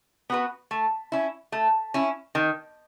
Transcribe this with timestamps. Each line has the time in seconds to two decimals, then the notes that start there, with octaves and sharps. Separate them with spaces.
0.30 B3 F#4 B4
0.71 A3
1.12 C#4 E4
1.52 A3
1.94 C#4 E4
2.35 D#3